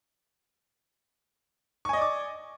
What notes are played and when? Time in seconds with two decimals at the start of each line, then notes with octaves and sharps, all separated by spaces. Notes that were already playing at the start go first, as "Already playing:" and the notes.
1.85 C#6
1.89 G#5
1.93 D#5
1.97 D5
2.02 D6